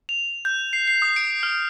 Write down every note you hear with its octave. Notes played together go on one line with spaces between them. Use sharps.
F7
G6
C7
C7
D#6
D7
F6